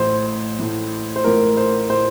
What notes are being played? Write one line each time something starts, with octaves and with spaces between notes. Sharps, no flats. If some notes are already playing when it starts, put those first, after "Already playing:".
Already playing: A1 A2 C5
A1 A2
C5
A1 A2 A#4
C5
A2 C5